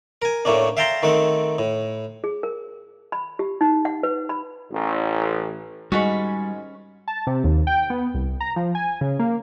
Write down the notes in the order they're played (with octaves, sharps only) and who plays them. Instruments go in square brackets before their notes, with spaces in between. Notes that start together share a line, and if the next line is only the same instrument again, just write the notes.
[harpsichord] A#4 G#5
A2 A3 A#3 C#4 D4
E5 F5 G5 A5 A#5 C6
D#3 A3 C4 F#5
A2
[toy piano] G#4
A#4
B5
G4
D#4
F#5
B4
B5
[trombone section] A1
[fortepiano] G#2 D#3 G#3 [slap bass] G3 [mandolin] C#4 B5 C#6 [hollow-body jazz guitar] F#4
[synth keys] A5
C3
D#2
G5
B3
C2
A#5
F3
G#5
C#3
A#3